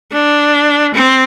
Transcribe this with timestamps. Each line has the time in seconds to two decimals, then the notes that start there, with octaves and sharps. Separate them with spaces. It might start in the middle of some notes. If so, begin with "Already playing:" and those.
0.12 D4
0.94 C4